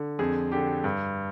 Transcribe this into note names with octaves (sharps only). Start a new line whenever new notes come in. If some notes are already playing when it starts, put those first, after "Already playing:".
Already playing: D3
F2 G#4
D3 G4
G2